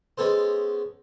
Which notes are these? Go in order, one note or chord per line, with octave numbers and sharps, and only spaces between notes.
G#3 B3 C#4 A4 C5